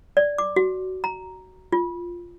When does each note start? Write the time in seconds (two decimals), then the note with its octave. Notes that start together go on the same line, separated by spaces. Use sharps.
0.17 D5
0.38 D6
0.56 F#4
1.04 A#5
1.72 F4